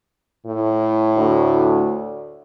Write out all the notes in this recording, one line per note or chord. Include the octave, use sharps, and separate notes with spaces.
A2
D2